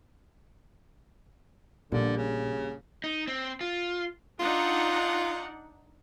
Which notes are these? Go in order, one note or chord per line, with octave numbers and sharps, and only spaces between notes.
A#1 A#2 D3 G3 A#3 B3
C#3
D#4
C4
F4
D4 D#4 F4 F#5